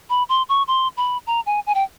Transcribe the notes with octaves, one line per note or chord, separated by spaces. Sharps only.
B5
C6
C#6
C6
B5
A#5
G#5
G#5
G5